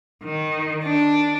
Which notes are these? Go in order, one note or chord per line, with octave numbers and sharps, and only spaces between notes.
D#3
D4